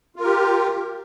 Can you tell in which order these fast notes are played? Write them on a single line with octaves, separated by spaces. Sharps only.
F4 A#4 G4